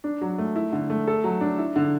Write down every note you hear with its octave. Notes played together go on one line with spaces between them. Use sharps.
D4
F#3
A3
E4
D3
A3
A4
F#3
D4
E4
D3